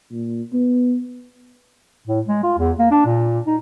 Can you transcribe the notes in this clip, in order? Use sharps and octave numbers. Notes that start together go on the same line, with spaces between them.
A#2
B3
A2
G#3
F4
E2
A#3
D4
A#2
D#4